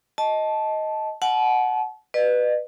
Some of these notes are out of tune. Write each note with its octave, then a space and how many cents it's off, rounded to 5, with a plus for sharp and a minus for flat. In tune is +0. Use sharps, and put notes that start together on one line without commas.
D#5 +10 A5 -10
F#5 +0 A5 -35
B4 +0 D#5 -45